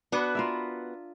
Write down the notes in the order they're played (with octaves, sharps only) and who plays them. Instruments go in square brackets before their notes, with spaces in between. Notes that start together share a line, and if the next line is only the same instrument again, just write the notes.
[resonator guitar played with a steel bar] B3 F#4 B4 [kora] D4
[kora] F4 A#4 E5